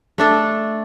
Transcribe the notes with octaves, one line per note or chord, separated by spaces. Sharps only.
A3 D4 A4